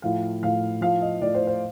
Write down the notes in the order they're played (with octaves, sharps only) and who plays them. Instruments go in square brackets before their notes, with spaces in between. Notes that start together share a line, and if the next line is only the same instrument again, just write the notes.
[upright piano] A2 F3 F5
A2 F3 F5
A2 F3 F5
D#5
A2 F3 D5
C5
C5